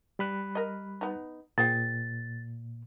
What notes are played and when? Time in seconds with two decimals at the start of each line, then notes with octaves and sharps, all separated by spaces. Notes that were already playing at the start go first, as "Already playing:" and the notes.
0.19 G3 B5 F#6
0.55 A#4 D#5
1.01 B3 D#4
1.58 A#2 G#4 C5 G5 A6